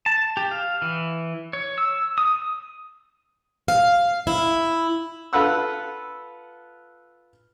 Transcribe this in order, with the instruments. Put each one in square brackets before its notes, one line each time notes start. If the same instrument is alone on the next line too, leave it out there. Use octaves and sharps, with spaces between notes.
[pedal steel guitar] A5
G4
F5
E3
C#5
E6
D#6
[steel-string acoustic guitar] F5
E4
[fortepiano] F4 A4 B4 F#5 E6